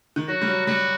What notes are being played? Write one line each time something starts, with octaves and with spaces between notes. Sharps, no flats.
D#3
F#3 F#4
G3
F#3
G3 F#4